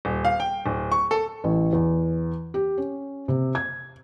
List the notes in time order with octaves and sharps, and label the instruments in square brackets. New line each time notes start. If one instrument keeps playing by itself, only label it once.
[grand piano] D#1
F5
G5
D1
C#6
A4
[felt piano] A1
E2
G4
C#4
C3
G#6